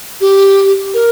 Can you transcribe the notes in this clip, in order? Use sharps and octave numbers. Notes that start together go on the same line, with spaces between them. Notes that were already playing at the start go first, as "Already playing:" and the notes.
G4
A#4